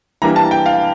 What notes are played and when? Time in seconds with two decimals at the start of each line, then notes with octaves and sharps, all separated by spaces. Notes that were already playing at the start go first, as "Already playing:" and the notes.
0.22 E3 G3 A#3 D4 A#5
0.36 A5
0.51 G5
0.66 F5